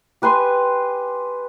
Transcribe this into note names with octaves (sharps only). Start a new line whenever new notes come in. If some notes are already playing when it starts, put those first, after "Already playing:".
G4 B4 G#5 C6